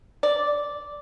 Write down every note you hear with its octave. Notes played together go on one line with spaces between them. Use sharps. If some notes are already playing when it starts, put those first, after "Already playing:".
D5